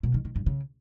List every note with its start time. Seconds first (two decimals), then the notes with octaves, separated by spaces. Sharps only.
0.03 B2
0.14 D#3
0.25 D#3
0.36 G2
0.46 C#3